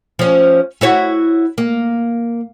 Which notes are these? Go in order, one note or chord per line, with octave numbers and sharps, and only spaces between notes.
F3 C#4
E4 F#4 C#5
A#3